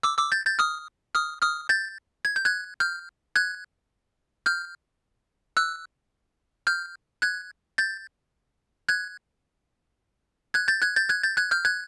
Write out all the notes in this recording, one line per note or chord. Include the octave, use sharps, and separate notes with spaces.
D6 E6
D6 E6
G6 A6
G6 A6
D#6 F6
D#6 F6
D#6 F6
G6 A6
G#6
G6
F#6 G#6
F6 G6
F#6 G#6
F6 G6
E6 F#6
F6 G6
F#6 G#6
G6 A6
F#6 G#6
F#6 G#6
G6 A6
F#6 G#6
G6 A6
F#6 G#6
G6 A6
F#6 G#6
F6 G6
F#6 G#6